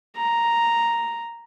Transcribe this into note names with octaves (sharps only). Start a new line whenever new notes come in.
A#5